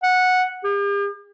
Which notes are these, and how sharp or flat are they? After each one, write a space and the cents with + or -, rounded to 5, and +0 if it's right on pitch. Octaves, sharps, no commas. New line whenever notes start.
F#5 -10
G4 +45